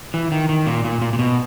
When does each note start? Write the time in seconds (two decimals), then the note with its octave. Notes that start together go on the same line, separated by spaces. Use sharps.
0.14 E3
0.32 D#3
0.49 D#3
0.67 A#2
0.84 A#2
1.02 A#2
1.13 A#2
1.19 B2